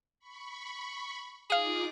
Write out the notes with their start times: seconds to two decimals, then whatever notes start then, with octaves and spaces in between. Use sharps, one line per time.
0.19 B5 C#6
1.50 D#4 F4 G#4 F5 D6 D#7